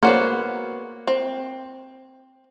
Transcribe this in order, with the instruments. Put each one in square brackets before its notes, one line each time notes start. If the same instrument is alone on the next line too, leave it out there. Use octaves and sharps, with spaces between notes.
[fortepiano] A#3 C#5 F#5 [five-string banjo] B3 F#4 C5
[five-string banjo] C4